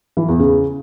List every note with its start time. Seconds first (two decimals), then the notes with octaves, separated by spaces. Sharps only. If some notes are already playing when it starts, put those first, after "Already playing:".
0.17 E3
0.28 E2
0.40 C#3